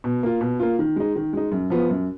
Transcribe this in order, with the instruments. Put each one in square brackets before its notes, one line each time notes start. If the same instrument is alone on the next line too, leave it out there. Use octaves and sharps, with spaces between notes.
[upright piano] B2
A#3 F4
B2
A#3 F4
D#3
G#3 D#4
D#3
G#3 D#4
F#2
F3 B3 F4
F#2